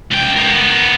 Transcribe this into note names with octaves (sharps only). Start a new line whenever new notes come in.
C#2 G5
B3 A#4